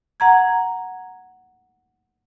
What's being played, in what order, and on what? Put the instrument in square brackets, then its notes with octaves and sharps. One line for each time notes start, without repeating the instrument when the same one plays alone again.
[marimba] F#5 A#5 G#6